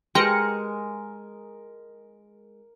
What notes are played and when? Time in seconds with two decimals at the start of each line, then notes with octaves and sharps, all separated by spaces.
0.15 G#3 G4 A#4 B4 G5 C6 A#6 C#7